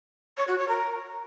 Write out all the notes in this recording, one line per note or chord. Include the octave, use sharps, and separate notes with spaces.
C#5
F#4
C#5
A#4